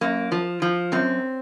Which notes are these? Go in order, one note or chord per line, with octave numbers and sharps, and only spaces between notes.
F#2 A#3
F3
F3
F#2 C4